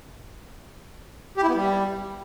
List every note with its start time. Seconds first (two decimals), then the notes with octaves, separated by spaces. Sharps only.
1.37 G4
1.43 E4
1.49 B3
1.55 G3